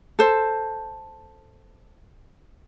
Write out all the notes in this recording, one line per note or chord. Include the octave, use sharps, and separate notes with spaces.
A4 C5